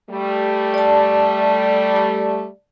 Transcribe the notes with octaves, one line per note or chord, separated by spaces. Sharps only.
G3 A3
D5 A5